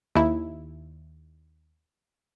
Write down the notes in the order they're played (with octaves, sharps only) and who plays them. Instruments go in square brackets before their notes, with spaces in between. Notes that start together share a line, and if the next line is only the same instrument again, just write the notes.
[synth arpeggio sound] D#2 E4